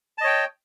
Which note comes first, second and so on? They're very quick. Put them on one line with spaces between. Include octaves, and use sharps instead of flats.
A5 D#5 C#5 G5